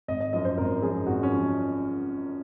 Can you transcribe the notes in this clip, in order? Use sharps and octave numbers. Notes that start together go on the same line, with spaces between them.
G#1 D#5
D#5
F#2 F3 D#5
C5
G#1 A#4
F#2 F3 G#4
G#1 F#4
C#4
F3